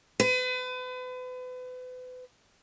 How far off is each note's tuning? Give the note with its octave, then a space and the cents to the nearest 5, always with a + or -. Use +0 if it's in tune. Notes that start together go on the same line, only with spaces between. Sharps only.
B4 +35